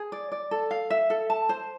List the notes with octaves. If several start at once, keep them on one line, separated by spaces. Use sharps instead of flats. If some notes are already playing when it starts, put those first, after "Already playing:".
Already playing: G#4
D5
D5
A4
F5
E5
A4
A5
C5